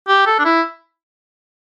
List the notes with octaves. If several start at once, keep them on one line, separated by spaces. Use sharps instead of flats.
G4
A4
D4
E4